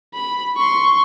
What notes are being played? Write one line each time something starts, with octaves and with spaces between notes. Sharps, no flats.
B5
C6 C#6